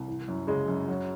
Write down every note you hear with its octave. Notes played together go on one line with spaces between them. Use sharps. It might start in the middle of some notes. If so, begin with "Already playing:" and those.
Already playing: C2
E3
F#2
C#3 G#3
F#2
F#3